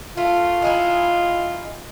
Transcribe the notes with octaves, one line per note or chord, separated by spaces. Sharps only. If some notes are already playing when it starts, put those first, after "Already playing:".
A3 F4
G#3 D#4 E4